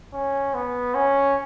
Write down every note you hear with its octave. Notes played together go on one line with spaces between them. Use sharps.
C#4
B3
C#4